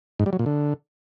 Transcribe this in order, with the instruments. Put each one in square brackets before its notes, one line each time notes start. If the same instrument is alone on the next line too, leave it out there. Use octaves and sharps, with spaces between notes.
[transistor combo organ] G#2
G3
F#3
A#2
D3